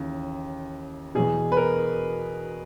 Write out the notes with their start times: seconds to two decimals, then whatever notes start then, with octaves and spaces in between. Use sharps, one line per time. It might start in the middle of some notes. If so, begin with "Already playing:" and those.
Already playing: D#2 C#3 E3
1.15 E2 B2 G#4
1.52 B4
1.57 A#4